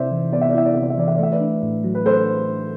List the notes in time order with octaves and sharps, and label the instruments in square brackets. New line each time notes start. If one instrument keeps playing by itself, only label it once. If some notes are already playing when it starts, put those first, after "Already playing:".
Already playing: [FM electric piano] C3 E4 [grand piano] C5 D5 E5
[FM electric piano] E3
[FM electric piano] B3 [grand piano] D5
[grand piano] E5
D5
[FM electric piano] E4 [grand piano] E5
[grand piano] D5
[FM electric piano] C3 [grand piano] E5
[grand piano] D5
E5
[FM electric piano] E3 [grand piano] D5
[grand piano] E5
D5
[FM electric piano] A3 [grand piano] E5
[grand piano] B4 D5
[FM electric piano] D4
A2
F#3
[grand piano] B4
[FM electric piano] A3 [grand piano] A4 C5